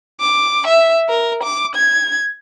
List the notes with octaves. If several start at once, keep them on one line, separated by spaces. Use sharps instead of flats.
D6
E5
A#4
D6
G#6